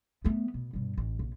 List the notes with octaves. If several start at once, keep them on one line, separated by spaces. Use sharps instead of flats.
A3 B3
B2
G2 B2
A1
A#1